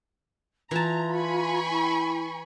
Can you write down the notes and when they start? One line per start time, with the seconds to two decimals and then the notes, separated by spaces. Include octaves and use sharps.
0.71 E3 F4 A5 A#5
1.15 G#5 B5 C#6
1.70 E4